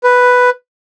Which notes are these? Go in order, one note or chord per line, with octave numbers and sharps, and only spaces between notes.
B4